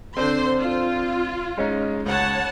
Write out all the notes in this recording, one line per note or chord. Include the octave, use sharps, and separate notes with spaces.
D3 C4 D4 C5 C6
F4
G#3 C#4 D#4
C#2 C#5 F#5 A5